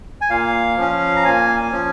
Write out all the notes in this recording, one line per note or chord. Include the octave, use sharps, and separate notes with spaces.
G#5
A#2 F5
F3 C#4
A#5
A#2 G#5
F3 C#4